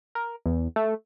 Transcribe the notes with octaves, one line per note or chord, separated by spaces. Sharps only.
A#4
E2
A3